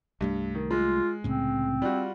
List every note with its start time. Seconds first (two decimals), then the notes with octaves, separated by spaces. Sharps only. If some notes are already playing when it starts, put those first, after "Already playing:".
0.21 C2 G2 G3 A3
0.55 D#3
0.71 G#3 F4
1.24 C2 A2 C#3 C4
1.82 G3 F4 F#4